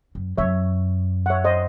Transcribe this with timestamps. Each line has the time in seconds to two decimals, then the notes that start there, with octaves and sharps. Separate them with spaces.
0.15 F#2
0.38 F#2 C#5 E5
1.26 F#5
1.30 C#5 E5
1.45 C5 D#5